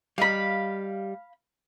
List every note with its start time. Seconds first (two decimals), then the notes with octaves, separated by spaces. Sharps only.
0.18 G3 D#5 F5 A#5 B5